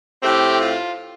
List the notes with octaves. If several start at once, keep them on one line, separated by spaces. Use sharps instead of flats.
A2 A3 C4 G4
F4